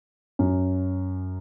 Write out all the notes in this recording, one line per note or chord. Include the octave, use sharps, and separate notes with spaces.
F#2